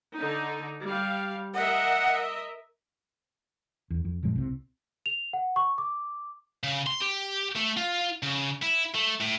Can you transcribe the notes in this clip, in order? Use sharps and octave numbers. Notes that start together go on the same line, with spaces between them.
D3 D#4
G3 F5
A#4 D#5 E5 F#5
E2
F2
F#1 A#2 F3 G#3
C2 C3
F7
F#5
C#6
D6
C#3
C6
G4
A3
F4
C#3
E4
A3
A2